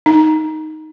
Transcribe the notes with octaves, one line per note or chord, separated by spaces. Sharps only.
D#4